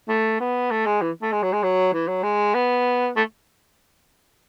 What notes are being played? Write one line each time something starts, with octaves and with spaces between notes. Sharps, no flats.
A3
B3
A3
G#3
E3
A3
G#3
F#3
G#3
F#3
E3
F#3
G#3
B3
A3